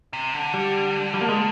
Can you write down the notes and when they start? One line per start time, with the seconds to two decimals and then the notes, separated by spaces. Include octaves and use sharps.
0.13 C3
0.34 D3
0.54 G3
1.14 G3
1.21 A#3
1.29 G#3